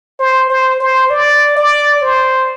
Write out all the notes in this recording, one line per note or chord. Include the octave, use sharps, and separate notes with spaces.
C5
C5
C5
D5
D5
C5